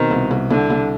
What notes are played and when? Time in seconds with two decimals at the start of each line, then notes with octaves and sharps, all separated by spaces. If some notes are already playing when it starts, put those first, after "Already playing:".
Already playing: B2 D#3 C4
0.11 C2
0.31 C2
0.51 C2 D3
0.70 C2